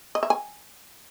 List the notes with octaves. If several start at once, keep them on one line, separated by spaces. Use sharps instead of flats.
D#5
E5
G#5